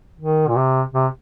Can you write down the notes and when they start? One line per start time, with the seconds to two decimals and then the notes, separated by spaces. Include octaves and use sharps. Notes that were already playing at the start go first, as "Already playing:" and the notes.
0.20 D#3
0.48 A#2
0.56 C3
0.94 C3